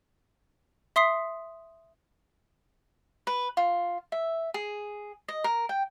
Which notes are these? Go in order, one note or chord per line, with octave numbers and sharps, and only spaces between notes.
E5 C6 D#6 B6 C7
B4
F4
E5
G#4
D#5
A#4
G5